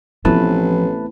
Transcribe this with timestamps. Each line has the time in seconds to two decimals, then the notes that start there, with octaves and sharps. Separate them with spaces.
0.25 A1 F3 A3 B3 C4 E4 B4 A5